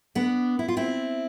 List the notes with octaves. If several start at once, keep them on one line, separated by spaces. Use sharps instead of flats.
B3 D4
E4
F4
C4 E4